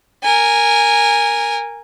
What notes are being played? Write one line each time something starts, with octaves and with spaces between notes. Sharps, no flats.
A#4 G#5